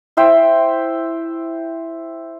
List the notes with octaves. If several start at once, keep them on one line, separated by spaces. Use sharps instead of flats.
E4 C5 E5 G5